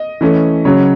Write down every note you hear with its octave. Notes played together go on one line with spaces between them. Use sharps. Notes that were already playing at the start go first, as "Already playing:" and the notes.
Already playing: D#5
E3 A3 C#4
C#3 F#3 C#4 C#5